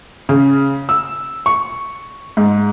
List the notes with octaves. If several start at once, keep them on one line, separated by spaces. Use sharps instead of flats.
C#3
E6
C#6
G#2